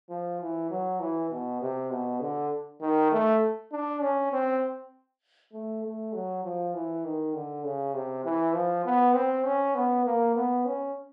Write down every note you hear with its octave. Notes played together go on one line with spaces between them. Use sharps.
F3
E3
F#3
E3
B2
C3
B2
D3
D#3
A3
D4
C#4
C4
A3
A3
F#3
F3
E3
D#3
D3
C#3
C3
E3
F3
B3
C4
C#4
B3
A#3
B3
C#4